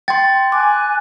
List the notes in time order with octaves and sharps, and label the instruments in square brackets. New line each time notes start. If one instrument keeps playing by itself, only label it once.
[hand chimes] G5 C6 [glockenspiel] A6
[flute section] G#5 F#6 [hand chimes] D6